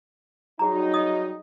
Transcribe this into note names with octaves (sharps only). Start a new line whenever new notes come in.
F#3 G3 D#4 F#4 G#4 A#5
D#5 D#6